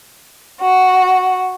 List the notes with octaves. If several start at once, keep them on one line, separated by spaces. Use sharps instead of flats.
F#4